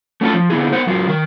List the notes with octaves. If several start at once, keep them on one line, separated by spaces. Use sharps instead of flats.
A3 C#4 E4 F4 A4
F3
D3 B3 E4 G#4
B3 C5 F#5
F#2 F#3 F4
D#3 A#4